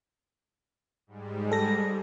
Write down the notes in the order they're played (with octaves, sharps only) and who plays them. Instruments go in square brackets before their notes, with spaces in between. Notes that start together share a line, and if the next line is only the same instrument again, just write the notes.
[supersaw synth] G#2 G3 G#3
[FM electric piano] A4 A#6